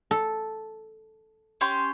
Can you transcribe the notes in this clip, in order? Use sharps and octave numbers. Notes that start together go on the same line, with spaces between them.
A4
C#4 G4 C6